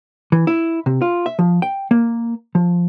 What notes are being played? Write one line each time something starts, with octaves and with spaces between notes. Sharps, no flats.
E3
E4
C3
F4
E5
F3
G5
A#3
F3